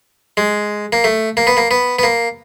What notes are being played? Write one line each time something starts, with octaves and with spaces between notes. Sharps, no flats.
G#3
A#3
A3
A#3
B3
A#3
B3
B3
A#3